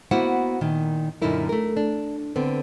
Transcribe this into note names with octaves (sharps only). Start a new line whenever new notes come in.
A#3 B3 E4 F#4 C5 F#5
A#2 D#3
F#2 A#2 D3 D#4 E4 A#4
A3 A#4
D4
D3 B3 C4